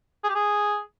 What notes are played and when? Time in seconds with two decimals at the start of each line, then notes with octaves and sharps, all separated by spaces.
0.24 G#4
0.29 G4
0.35 G#4